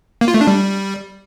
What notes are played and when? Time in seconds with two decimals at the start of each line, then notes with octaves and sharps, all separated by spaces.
0.21 A#3
0.28 F4
0.34 A3
0.41 D4
0.47 G3